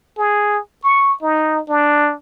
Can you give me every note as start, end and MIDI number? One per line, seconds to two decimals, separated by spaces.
0.18 0.59 68
0.84 1.16 85
1.22 1.61 63
1.68 2.14 62